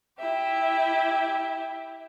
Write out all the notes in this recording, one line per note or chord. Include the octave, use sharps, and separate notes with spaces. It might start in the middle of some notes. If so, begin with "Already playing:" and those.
E4 G4 E5